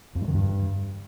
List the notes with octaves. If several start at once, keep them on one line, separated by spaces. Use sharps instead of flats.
F2
G2
D#3
G2